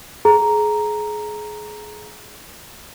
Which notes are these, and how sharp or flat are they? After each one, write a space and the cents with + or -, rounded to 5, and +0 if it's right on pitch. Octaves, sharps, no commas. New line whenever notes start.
G#4 +25 A#5 +0